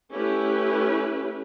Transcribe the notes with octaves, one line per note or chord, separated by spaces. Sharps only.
A3 C#4 E4 G4 B4